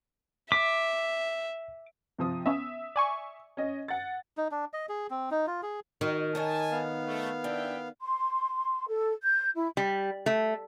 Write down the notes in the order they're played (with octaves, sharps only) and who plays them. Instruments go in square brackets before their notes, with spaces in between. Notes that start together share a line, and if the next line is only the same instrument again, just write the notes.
[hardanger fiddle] E5 [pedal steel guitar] D6 [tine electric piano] B6
[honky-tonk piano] C3 F3 D#6
[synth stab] B3 C#4 [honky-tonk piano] E5
[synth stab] D5 G#5 C#6
[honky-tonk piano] C#4 D#5
F#5 A6
[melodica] D#4
D4
D#5
G#4
C4
D#4
F4
G#4
[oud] D#3 [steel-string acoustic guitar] F#4
[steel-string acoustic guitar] D#4 C#5 D#5 [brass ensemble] G#5 A5
[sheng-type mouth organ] B3 F5
[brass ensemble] A3
[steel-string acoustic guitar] D4 [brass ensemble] E4 E5 G5
[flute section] C6
A4
G6
E4
[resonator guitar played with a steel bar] G3
A3